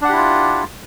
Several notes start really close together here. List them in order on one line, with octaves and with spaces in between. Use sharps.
D4 F#5 G4 E4 F4